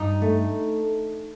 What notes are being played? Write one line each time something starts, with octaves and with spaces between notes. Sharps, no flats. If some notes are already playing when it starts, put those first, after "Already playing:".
Already playing: G2 D#4
A3